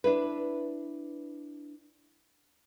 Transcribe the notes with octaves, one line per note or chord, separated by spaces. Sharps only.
D4 E4 B4